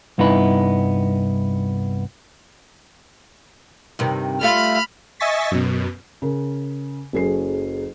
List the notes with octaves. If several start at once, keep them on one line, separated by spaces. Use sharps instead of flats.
C2 G2 B3 D#4 E4 B4
G2 C3 D#3
G3 A3 F4 B5 F6
D#5 E5 G#5 C#6 A6 B6
F#2 B2
C#3 A#4
F#1 F#3 C#4 G#4 A4 C7